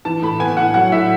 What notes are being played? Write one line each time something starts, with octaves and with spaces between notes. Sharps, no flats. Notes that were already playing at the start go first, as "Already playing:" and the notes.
E3 A5
A2 B5
B3 G#5
A2 F#5
F#3 F#5
A2 E5